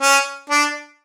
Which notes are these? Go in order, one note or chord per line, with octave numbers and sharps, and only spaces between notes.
C#4
D4